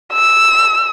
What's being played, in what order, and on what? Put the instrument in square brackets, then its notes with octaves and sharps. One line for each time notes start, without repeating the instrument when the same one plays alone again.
[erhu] E6